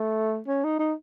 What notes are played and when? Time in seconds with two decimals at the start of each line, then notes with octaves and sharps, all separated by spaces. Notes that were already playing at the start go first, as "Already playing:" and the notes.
Already playing: A3
0.48 C#4
0.64 D#4
0.79 D#4